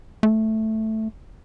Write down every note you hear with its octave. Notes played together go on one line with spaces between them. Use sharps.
A3